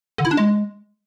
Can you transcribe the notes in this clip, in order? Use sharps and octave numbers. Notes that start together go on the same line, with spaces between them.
D3
E4
D4
G#3